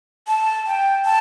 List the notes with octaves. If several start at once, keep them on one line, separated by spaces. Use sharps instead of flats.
A5
G5
A5